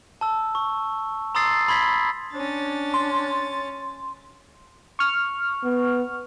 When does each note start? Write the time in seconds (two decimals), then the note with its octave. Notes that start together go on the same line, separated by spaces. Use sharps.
0.21 A5 E6
0.55 C#6
1.35 A#5 C6 D#6 E6 A6 C7
1.68 B5 C6 G#6 B6
2.33 C#4 D4 A6
2.94 C6
4.99 C#6 F6
5.64 B3